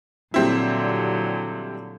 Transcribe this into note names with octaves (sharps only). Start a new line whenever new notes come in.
A#2 D3 F#3 G3 C4 E4